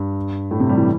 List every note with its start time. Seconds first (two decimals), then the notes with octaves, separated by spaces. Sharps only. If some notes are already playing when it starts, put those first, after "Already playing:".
Already playing: G2
0.51 A2
0.60 C3
0.69 G3
0.78 E3